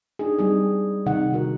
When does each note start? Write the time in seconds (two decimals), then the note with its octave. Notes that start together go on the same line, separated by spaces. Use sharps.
0.19 D4 D#4 G#4
0.39 G3 G#3 C4 D#4 G#4
1.06 C3 D#3 D#4 F#5
1.32 D3 F#4 A#4